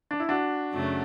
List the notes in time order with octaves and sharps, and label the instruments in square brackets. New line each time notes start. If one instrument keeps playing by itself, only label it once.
[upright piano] D4
E4
D4 F#4
[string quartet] F#2 C#3 F#3 A3